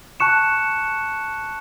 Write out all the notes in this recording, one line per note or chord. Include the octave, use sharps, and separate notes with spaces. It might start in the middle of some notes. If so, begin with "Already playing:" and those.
A5 C#6 F#6 C#7 E7